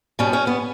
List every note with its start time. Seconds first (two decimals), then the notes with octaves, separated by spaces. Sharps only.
0.19 B2 G3 C#4
0.33 C#4
0.47 B3